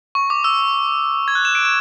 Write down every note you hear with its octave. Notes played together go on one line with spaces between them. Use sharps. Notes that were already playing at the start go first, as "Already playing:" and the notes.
C#6
D6
E6
G#6
F#6
E7
D7
E7